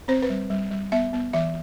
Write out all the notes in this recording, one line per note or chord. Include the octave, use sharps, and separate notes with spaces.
C4 C5
B4
G3
G3
G3
B3 E5
B3
E3 E5